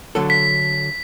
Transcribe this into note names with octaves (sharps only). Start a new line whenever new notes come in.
D3 F#3 A4
B6